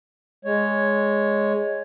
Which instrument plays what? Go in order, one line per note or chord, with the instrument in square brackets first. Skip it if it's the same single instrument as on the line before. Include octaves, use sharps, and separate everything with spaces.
[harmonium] G#3 C#5